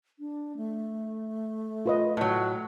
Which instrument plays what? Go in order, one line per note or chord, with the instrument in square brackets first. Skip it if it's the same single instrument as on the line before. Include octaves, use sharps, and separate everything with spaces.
[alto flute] D4
A3
[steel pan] F4 B4 D#5
[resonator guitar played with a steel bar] A2 F#3